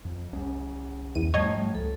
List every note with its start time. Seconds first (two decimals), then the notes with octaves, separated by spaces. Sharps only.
0.05 F2
0.33 C2 C#4
1.15 E2 D#7
1.34 G#2 F3 G3 A3 C#5 D#5 G#6
1.75 C#2 A4